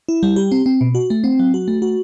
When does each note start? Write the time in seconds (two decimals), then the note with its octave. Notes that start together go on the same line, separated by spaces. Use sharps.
0.09 E4
0.23 G3
0.36 G4
0.52 C4
0.66 C4
0.81 B2
0.95 F#4
1.10 A3
1.24 C4
1.39 F#3
1.54 F#4
1.68 A3
1.82 F#4